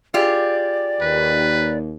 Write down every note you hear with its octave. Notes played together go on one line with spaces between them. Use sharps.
F4 G4 G#4 D5
D#2 B4